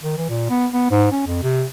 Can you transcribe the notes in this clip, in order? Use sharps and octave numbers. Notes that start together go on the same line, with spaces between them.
D#3
E3
A#2
B3
B3
G#2
C#4
F2
C3